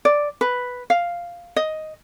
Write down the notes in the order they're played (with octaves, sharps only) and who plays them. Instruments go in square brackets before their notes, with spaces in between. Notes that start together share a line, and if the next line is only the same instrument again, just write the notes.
[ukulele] D5
B4
F5
D#5